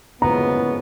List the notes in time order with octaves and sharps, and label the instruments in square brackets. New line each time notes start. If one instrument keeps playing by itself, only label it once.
[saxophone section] C#3 F3 G#3 B3 [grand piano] A#5